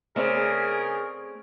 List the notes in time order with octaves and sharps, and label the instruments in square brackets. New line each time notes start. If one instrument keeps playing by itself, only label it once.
[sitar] C#3 [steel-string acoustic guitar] A3 C4 D5 [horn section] G#4 A#4